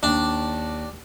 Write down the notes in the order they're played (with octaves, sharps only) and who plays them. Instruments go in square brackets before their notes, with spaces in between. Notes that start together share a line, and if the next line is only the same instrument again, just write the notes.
[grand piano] D#2 [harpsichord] D4